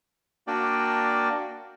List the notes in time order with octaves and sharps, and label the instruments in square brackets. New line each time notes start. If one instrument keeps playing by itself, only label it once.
[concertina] A#3 D4 F#4 D5 G5